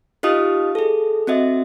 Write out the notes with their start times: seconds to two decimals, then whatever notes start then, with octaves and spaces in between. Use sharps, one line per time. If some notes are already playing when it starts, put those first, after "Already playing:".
0.23 D#4 F4 G4 D#5 F5 D#6
0.75 G#4 A4
1.27 C4 F#4 D#5 E5